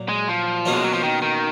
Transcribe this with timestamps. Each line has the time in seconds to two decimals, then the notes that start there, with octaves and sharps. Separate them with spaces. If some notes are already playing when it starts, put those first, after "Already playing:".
Already playing: A#2 F#3
0.09 G#3
0.28 F3
0.65 B2 A#3 C#4 F4
0.73 G#3
0.83 F#3
0.93 F3
1.03 D#3
1.22 D#3